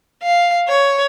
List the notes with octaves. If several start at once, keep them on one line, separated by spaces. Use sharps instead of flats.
F5
C#5